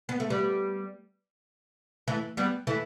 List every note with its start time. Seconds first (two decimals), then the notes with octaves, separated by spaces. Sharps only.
0.09 B3
0.20 A3
0.30 G3 B3
2.08 E3 A3
2.37 G3 B3
2.67 E3 A3